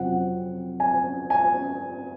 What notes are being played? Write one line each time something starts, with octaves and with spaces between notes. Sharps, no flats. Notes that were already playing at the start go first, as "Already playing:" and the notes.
Already playing: F2 C3 F#3 C4 F#5
G#5
G#5